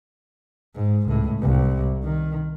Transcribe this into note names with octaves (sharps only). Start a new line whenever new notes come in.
G#2
C#2 A2
C2
D#3